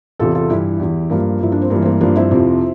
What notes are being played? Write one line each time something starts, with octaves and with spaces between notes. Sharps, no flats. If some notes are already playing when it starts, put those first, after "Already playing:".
E2 C3 E3 F4 A4
F4 A4
G2 E3 E4 G4
E2 E3
G2 F3 A#3
G2 F3 E4
D4
C4
G2 E3 A#3
C4
A#3
G2 F3 A#3 D4
C4 E4
F2 C3 F3